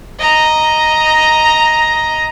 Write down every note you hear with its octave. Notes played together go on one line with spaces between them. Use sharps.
D#5 A#5